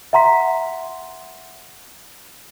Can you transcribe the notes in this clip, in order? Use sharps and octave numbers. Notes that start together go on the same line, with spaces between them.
E5 F#5 A#5 C6 B6